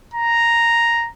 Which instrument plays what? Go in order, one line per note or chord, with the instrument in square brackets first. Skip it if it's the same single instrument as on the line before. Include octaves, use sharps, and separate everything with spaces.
[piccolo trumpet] A#5